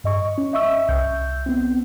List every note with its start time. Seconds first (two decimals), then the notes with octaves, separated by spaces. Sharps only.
0.04 G2 D#5 C#6
0.38 C#4
0.53 D#5 E5 C#6 E6
0.88 C2 G6
1.46 B3 C4